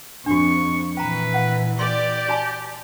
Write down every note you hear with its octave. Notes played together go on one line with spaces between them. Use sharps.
F2 D4 F#4 C#6
A#2 E3 B4 G5 A#5
F5 F#5
G4 D5 C6
F#4 G#5 A5